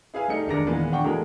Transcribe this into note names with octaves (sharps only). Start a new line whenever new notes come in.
E4 G#4 B4 F5 G#5
G3 A3 D#4 C#7
E1 D#2 G#3 D4 A#4 A#6
D#2 A#2 E3 G#3 A#3 B3
D4 F#5 G5 C#6
B2 E3 G#3 A3 A#4